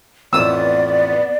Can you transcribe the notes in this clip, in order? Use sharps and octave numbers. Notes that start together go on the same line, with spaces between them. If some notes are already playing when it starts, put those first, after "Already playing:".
A1 F2 B3 D5 D#6 E6